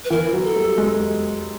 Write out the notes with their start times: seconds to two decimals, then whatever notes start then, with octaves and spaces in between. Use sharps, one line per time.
0.04 B4
0.10 E3 A#4
0.33 F#3
0.44 A4
0.56 G3
0.78 G#3